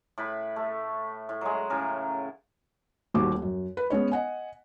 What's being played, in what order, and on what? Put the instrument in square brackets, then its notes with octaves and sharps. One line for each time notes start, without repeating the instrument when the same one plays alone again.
[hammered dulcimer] A2 B4 B5
A3
A2
F#3 G#3
A2 C#3 A#4
[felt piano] D#1 D#2 F#4 D6
F#2
B4
G#3 B3 C#4 C#5
D#5 F#5 G#5